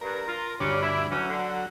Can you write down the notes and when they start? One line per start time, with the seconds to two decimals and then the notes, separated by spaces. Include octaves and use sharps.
0.01 G2 A#4
0.27 F4
0.60 D2 G2 F#3 G3 C#4 D4
0.82 E4
1.12 E3 F#3 A3 C#4
1.29 D3